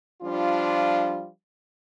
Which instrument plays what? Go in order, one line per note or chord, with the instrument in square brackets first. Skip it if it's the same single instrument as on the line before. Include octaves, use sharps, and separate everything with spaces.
[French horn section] F3 G3 D4 F4